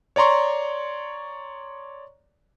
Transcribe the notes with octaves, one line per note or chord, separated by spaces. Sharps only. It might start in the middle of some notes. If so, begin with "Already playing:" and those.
C#5 D5 A#5 C6 C#6